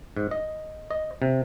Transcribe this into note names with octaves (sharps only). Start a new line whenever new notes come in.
G#2
D#5
D#5
C3